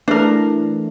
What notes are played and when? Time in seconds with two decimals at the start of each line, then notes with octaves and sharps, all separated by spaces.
0.08 E3 A3 D4 A#4